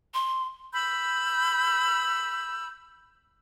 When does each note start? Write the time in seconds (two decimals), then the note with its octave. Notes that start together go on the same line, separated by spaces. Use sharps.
0.14 C6
0.72 B5 E6 G6